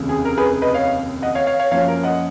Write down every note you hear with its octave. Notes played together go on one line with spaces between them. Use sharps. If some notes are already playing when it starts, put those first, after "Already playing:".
Already playing: F1 D#2 C#3
G#4
A#4
G#4 B4
B4 D#5
C#5 F5
D#5 F#5
C#5 F5
C#5 F5
C#5 F5
F#2 F3 A#3 C#4 F4 C#5 F5
A#4
D#5 F#5